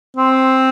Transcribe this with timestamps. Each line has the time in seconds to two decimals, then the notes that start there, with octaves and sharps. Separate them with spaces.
0.17 C4